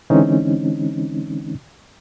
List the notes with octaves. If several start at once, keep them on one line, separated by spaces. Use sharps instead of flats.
D3 E3 G#3 C4 C#4 D#4